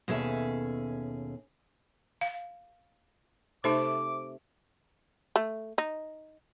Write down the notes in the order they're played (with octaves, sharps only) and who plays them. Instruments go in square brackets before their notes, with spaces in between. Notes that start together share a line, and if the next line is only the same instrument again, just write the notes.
[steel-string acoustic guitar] D#2 B2 C#4 G#4 A4 E5
[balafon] F5
[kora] C3 A3 [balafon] D#4 C5 [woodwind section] D6
[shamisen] A3
D#4